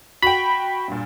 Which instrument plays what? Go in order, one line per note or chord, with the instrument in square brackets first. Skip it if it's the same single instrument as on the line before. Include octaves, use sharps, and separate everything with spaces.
[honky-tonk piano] F#4 G5 [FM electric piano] B5
[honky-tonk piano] G2 A#2